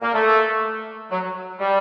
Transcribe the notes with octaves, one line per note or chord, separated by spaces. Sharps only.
A#3
A3
F#3
G3